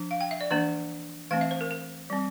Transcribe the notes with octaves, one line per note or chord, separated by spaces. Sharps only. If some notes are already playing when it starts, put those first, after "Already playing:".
Already playing: F3 D4
F5
G5
E5
D5
E3 A#3 D4 D5
E3 A3 C4 F5
E5
C5
A#4
A#4
G3 C4